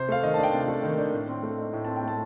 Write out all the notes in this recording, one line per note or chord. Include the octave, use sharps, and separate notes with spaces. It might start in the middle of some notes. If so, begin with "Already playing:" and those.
Already playing: C3 C5
A3 F5
D#3 D#5
D4 A5
G5
C3 F5
A3
D#3
D4
A2
C4
A3
D#4
A2
C4 A5
G5
A3 A5